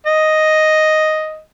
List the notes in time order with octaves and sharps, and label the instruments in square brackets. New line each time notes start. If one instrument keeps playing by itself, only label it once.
[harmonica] D#5